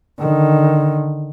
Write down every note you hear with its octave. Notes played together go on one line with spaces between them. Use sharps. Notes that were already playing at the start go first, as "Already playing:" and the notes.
D3 D#3